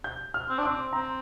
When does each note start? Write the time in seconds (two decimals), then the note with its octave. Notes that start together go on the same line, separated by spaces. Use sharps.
0.04 G6
0.34 F6
0.49 C4
0.58 D4
0.63 C4 D6
0.93 C4 A#5